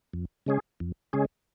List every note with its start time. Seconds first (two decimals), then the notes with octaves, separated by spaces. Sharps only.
0.13 F2
0.46 C#3 G#3 C#4 G#4
0.80 F2
1.13 C#3 G#3 C#4 G#4